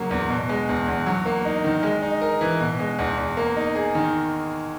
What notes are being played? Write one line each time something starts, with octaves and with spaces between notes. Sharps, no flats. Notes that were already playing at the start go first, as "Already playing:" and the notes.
Already playing: C#3 F#3 A#3
E2
B2
G#3
E2
E2
F#3
A#3
D#4
D#3
G#3
D#4
A#4
E3
B2
G#3
E2
E2
A#3
D#4
G#4
D#3